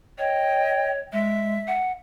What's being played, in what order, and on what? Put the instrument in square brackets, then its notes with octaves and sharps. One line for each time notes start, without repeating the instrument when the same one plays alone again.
[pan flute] C#5 [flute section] D#5 G5
[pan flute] G#3 [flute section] E5
[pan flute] F#5